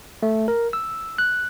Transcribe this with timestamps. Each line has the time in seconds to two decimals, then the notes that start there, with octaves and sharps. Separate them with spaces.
0.23 A3
0.48 A#4
0.73 E6
1.18 F#6